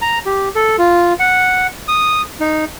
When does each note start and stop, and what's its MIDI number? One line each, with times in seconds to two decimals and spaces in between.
0.02 0.19 82
0.26 0.49 67
0.55 0.76 69
0.78 1.13 65
1.19 1.67 78
1.88 2.22 87
2.40 2.65 63